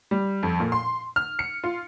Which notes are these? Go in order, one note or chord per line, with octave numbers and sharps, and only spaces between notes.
G3
F2
A#2
C6
F6
C#7
F4